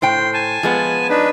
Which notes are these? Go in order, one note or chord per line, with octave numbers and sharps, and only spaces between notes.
A2 C5 G5 C6
G#5 A5
F3 G#3 B3
D4 D#4 B4